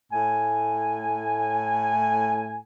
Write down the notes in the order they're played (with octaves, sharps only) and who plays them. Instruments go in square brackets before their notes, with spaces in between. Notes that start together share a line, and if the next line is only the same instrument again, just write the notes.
[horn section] A2 G#5